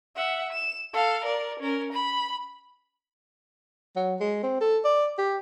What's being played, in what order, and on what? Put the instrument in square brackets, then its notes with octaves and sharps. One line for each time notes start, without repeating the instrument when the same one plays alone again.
[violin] E5 F#5
E7
A4 F5
A#4 D5
C#4 A#4
B5
[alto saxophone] F#3
G#3
C4
A4
D5
G4